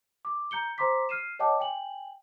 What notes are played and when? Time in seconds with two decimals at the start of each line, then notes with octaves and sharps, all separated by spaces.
0.25 D6
0.51 A#5 G6 C#7 G7
0.78 C5 A#5 C6 D6 B6
1.09 F6 C7 D#7 E7
1.39 C#5 D#5 F5 G5 A5 D6
1.60 G5 G#5 F#7